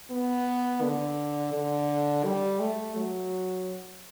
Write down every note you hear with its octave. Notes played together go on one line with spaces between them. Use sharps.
B3
D3
D3
G3
A3
F#3